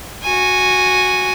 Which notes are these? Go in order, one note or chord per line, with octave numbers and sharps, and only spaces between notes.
F#4 G#5